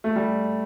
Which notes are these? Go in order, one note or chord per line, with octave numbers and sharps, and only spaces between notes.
A3
G3